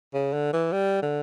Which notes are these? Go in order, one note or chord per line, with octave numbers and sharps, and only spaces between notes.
C#3
D3
E3
G3
D3